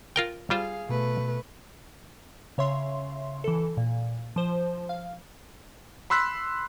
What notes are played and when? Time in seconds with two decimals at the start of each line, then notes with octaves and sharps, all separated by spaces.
0.16 F4 A#4 G5
0.50 G3 F4 G#4 C5 F5
0.89 B2 A3 B4
2.58 C#3 C#5 E5 C6
3.44 E3 A4
3.77 A#2
4.36 F3 C5
4.89 F5
6.10 B5 C6 E6 F#6 B6